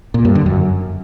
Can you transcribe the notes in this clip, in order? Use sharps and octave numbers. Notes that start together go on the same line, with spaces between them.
A#2
G2
D3
F#2